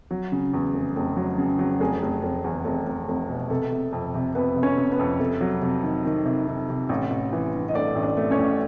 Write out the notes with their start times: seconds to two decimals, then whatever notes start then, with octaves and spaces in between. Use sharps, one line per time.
0.11 F#3
0.32 C#3
0.54 E2
0.74 F1
0.96 F1
1.17 F#3
1.38 C#3
1.59 F#3
1.80 F1 G#4
2.02 F1
2.23 F1
2.44 E2
2.65 F1
2.86 F1
3.08 F1
3.29 B2
3.50 C3 A4
3.72 C3
3.93 F2
4.14 C3
4.35 F2 B3 B4
4.56 C3
4.63 C#4 C#5
4.77 C3
4.92 B3 B4
4.99 F2
5.20 C3 A4
5.41 F#3
5.62 C3
5.83 D#3
6.05 D#3
6.25 C3
6.48 D#3
6.69 C3
6.89 A1
7.10 A1
7.33 E3
7.54 G2
7.69 D#5
7.74 A3 D4 D5
7.95 A1
8.03 D4 D5
8.17 A3
8.31 C#4 C#5
8.39 A1